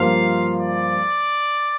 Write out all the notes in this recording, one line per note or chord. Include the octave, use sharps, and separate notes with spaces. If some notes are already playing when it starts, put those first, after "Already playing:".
Already playing: G2 F3 A#3 F4 C5 F5
D5